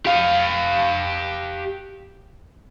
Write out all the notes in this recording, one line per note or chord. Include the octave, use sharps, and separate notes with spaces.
G4 F5